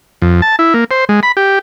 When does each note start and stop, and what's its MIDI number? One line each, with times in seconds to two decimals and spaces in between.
0.22 0.41 41
0.42 0.56 81
0.59 0.74 64
0.74 0.84 58
0.91 1.05 72
1.09 1.20 56
1.23 1.32 83
1.37 1.59 67